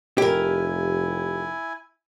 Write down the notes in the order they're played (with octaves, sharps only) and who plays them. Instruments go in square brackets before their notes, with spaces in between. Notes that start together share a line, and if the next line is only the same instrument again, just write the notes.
[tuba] F1 [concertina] E4 G#5 [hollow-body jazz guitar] G4 A#4